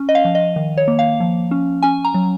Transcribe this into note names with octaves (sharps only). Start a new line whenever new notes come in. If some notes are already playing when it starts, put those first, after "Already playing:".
Already playing: C#4
D#5
F5
F3
D#5
D#3
C#5
A#3
F5
F3
C#4
C#4 G#5
A#5
F#3